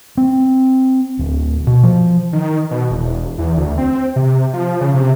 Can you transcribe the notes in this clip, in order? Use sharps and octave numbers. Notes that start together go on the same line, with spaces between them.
C4
D1
B2
F3
D#3
B2
E1
E2
D2
C4
C3
F3
C#3
C3